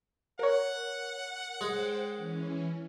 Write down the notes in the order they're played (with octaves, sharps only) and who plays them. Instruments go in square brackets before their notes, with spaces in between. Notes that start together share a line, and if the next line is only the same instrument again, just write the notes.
[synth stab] A#4 C#5 [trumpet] F#5
[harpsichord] G#3 [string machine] C5 G5
[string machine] E3 C#4